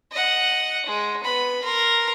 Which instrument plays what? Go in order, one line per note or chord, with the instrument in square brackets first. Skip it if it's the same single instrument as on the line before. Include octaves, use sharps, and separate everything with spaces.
[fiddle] D#5 F#5
G#3
B3 B5
A#4 C6